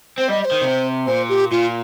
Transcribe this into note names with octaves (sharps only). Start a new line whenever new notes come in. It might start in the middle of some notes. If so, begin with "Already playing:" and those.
C4 C5
G3 D#5
D#5
C5
D#3
C3
A#2 C5
G4
A#2 F4